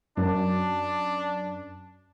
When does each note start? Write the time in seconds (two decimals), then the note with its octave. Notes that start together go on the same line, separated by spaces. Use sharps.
0.17 F#2 D4